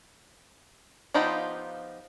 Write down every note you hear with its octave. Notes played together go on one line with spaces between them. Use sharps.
F3 B3 D#4 F4 G4